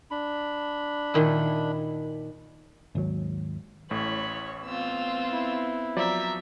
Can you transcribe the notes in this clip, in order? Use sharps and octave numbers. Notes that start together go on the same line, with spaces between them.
D4 B5
A#2 D#3 E4
G#1 D#2 F#3
A1 A2 C#5 B5
B3 C4 F4 E6
E4
F3 F#3 D5 E5 A#5